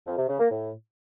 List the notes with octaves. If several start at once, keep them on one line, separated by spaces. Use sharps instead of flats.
F2
C3
C#3
A#3
A2